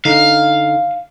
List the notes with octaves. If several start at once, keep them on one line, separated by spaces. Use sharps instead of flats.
D3 D#4 F5